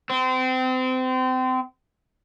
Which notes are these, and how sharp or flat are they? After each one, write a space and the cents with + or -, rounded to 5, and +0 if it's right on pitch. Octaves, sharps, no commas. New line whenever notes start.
C4 -30